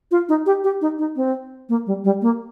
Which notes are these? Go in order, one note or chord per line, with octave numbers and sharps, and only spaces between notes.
F4
D#4
G4
G4
D#4
D#4
C4
A#3
G3
G3
A#3